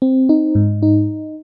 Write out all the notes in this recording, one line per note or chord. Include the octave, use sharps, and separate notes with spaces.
C4
D#4
G#2
D#4